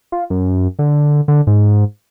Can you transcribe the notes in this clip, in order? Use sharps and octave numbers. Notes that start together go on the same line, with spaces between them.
F4
F#2
D3
D3
G#2